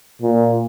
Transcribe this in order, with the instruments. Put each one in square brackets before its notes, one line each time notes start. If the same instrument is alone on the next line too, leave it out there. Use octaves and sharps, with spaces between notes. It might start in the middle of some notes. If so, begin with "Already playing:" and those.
[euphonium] A#2